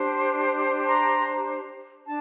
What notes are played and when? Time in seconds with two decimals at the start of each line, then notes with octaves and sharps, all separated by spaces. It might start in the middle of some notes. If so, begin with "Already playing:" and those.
Already playing: D4 G4 C5
0.88 A#5 C6
2.06 D4 A5